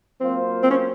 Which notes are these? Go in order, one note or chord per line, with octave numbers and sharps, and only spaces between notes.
F#3 A#3 C4 F4 C5
C4
C#4